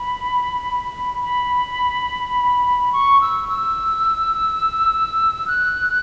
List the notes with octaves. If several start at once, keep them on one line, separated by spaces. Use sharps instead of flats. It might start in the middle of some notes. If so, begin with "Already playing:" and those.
Already playing: B5
B5
C#6
E6
E6
F#6